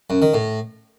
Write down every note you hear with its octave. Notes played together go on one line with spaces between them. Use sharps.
F#2
D#3
A2